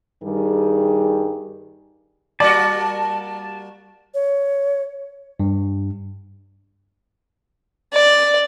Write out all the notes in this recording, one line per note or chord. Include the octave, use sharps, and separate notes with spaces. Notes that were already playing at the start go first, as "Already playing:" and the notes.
G2 D#3 G3 G#4
G3 A#3 F#4 D5 A5
C#5
G2
D5